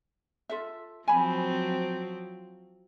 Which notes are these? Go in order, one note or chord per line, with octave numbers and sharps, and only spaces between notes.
F4 A4 E5
F3 F#3 C4 G#5 B5